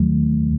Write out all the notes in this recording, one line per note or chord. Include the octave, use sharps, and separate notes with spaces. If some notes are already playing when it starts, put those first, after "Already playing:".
Already playing: D#2 D#3 F#3 A3